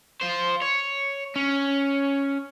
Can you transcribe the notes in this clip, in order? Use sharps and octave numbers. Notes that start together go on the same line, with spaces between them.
F4 C5
C#5
C#4